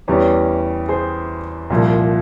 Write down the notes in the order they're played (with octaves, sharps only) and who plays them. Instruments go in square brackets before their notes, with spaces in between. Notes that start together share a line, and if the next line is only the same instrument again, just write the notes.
[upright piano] E2 E3 G3 C#4
G#4 C5
C2 A#2 F3